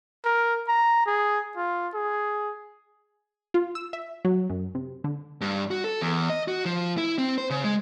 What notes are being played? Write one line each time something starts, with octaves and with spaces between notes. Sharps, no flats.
A#4
A#5
G#4
F4
G#4
F4
E6
E5
F#3
F#2
C3
D3
G2
F#4
A4
E2
D#5
F#4
F3
E4
C4
C5
C#3
G#3